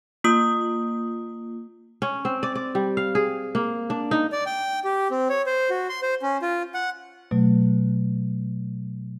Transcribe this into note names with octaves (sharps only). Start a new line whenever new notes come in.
A#3 F4 D#6
C#4
C4
D5
D5
G3
F5
G#4
A#3
D4
D#4
D5
G5
G4
C4
C#5
C5
F#4
C6
C5
C#4
F4
F#5
B2 F#3 A3